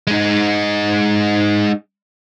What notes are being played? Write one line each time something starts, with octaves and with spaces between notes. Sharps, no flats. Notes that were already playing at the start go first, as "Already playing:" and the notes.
G#3 D#4